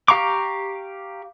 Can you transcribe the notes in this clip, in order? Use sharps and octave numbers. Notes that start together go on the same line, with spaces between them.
G4 F5 A#5 C#6 D6